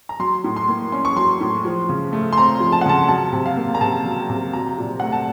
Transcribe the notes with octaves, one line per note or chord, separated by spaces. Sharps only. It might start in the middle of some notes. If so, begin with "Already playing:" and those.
A#5
F#3 C6
A2
C6
A#3
C#4 C6
C#6
F#3 C6
A2
F3
C#3
A3
C6
C4 A#5
F3
A5
F#5
C#3 A5
F#3 A5
C3
F5
A#3
A#5
C3 A5
F#3
C3
F#3 A#5
A#2
A3 F#5
A5